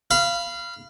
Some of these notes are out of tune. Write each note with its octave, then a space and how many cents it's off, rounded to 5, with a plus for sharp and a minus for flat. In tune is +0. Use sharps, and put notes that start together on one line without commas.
F5 -20 B5 +0